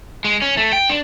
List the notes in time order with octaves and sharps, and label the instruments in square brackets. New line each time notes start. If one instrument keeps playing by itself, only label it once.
[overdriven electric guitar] G#3
C#4
A3
G5
D4